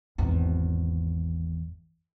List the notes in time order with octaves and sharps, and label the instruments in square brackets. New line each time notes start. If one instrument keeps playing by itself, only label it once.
[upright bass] G#1 E2